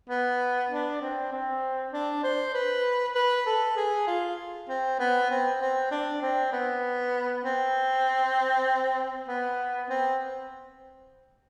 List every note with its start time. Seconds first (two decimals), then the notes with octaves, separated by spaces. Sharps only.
0.09 B3
0.70 D4
1.01 C4
1.32 C4
1.93 D4
2.24 C5
2.54 B4
3.15 B4
3.46 A4
3.77 G#4
4.07 F4
4.69 C4
4.99 B3
5.31 C4
5.61 C4
5.91 D4
6.22 C4
6.52 B3
7.44 C4
9.28 B3
9.90 C4